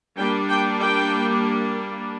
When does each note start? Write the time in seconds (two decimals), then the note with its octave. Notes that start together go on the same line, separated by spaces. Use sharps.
0.17 G3 A#3 D4 G5
0.50 G5
0.82 G5